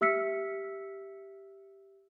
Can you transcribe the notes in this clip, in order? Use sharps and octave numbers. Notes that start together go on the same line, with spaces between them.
G4 E5 E6 F6 B6 C#7